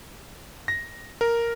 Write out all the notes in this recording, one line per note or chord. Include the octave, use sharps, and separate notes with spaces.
A#6
A#4